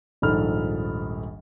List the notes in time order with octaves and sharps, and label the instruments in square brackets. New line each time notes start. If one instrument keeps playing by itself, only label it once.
[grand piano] D#1 A#1 G#2 A4 B5 F6